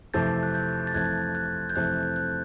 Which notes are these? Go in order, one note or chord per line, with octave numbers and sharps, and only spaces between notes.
F2 C3 E3 A3 C4 G6 A6
F#6
G6
A6
F2 C3 E3 A3 C4 F#6 G#6
F#6
G6
F2 C3 E3 A3 C4 F#6
F#6